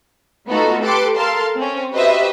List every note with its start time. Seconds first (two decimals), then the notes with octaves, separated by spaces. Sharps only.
0.49 A3 B3 D#4 F4 F#4 A4
0.83 G4 A4 B4 C6 D6
1.17 A4 A#4 F5 A5 C6
1.56 C4 C#4
1.93 F#4 G4 B4 C5 D#5 E5